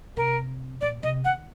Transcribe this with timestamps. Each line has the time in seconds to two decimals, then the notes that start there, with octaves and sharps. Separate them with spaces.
0.17 C3 A#4
0.81 A#2 D5
1.03 C3 D#5
1.25 D#3 F#5